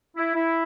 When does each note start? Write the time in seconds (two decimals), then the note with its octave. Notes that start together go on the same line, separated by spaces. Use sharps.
0.17 E4
0.35 E4